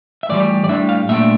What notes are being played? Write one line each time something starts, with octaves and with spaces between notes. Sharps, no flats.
E5
A2 E3 G3 D5
D5
A2 G3 D4 E5
F5
A#2 A3 D4 E5